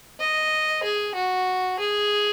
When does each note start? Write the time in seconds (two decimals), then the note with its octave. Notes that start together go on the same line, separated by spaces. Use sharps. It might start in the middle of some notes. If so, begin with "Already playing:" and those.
0.20 D#5
0.83 G#4
1.15 F#4
1.79 G#4